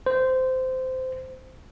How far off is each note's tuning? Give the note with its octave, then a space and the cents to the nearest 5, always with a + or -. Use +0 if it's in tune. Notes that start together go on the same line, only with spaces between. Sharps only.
C5 -15